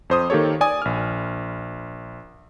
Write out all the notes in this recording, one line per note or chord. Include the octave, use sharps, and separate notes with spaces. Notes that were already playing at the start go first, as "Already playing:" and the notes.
F2 C5 D#6
D#3 A#3 G4 A4 C#5
D5 G#5 D#6
A#1 F6